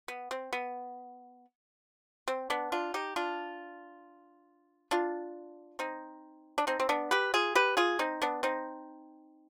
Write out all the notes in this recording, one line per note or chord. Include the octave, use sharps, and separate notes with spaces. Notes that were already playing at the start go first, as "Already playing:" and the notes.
B3
C4
B3
C4
B3 D4
D4 F4
D#4 G4
D4 F4
D4 F4
C4 D#4
D4
C4 D#4
C4
B3 D4
G4 B4
F4 G#4
G4 B4
F4 G#4
C4 D#4
B3 D4
C4 D#4